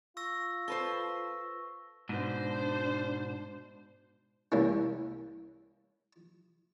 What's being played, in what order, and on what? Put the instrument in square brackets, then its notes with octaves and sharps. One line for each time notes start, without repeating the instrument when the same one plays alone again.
[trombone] F4 [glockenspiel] C#6 E6 A#6
[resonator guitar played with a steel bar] A4 B4 C5 [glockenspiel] C#6
[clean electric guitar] G#2 B2 [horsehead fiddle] D4 C5
[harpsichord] C2 A#3 C#4